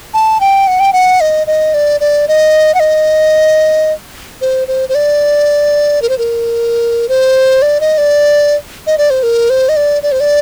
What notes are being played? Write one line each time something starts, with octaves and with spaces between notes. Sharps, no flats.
A5
G5
F#5
G5
F#5
D#5
D#5
D5
D5
D#5
F#5
D#5
C5
C5
C5
D5
A#4
C5
A#4
C5
D5
D#5
D5
D#5
D5
C5
A#4
C5
D#5
D5
D5
C5
D5